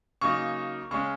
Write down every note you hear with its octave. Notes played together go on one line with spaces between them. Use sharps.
C#3 F#3 A#3 D#4 C#6
C#3 G#3 C#4 C#6